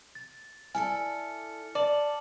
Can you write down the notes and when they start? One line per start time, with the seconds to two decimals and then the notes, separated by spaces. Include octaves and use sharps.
0.15 A6
0.75 E4 A4 D5 G#5 F6 C#7
1.75 D5 A5 F#7